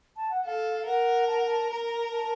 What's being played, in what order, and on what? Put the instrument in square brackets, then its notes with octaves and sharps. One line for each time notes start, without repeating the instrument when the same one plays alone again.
[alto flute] A5
F#5
[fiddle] A4 [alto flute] F5
[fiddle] A#4 [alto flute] F#5
[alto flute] A5
F#5
A5
[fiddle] A#4 [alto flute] A#5
[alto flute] A#5
A5